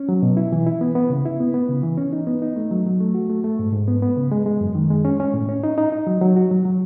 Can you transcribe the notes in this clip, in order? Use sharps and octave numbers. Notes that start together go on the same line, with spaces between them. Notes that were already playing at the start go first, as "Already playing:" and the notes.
Already playing: C#4
F#3
B2
E4
E3
E4
B3
B3
C#3
E4
B3
B3
C#3
E3
C#4
D#4
B3
D#4
A3
F#3
F#3
A3
F#4
A3
A3
G#2
G#2
B3
B3
C#3
G#3
G#3
F#2
D#3
G#3
C#4
C#4
A2
C#4
D#4
D#4
D#4
F#3
F#3
F#4
F#3
F#3